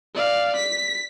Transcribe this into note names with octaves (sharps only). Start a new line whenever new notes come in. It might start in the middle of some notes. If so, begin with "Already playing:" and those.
D5 F5
B6